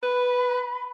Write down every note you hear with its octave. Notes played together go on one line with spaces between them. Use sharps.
B4 B5